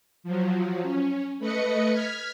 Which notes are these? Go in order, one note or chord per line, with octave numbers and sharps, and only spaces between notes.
F3 F#3
C#4
A3 B4 D#5 C#7
F6 G#6 B6